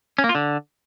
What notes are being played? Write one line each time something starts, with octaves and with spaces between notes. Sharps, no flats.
C#4
A#3
F4
D3